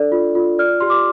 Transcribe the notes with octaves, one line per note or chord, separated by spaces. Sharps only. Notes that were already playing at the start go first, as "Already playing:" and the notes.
Already playing: D4 A4 D5
F4
F4
D5 F6
G4 C6
D6